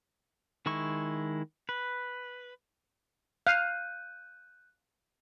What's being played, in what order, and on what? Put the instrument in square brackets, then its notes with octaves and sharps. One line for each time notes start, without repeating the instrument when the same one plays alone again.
[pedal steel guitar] D#3 G#3 E4 C#6
B4
[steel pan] F5 [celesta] F#6 G6 D#7